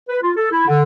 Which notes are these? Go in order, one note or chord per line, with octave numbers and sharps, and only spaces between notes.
B4
F4
A4
E4
D3